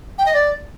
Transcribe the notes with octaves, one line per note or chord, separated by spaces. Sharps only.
G5
D#5
D5